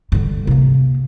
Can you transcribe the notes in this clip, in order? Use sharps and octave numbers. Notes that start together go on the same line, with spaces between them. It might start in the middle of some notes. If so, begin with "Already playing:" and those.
G2 D3
C3 A#3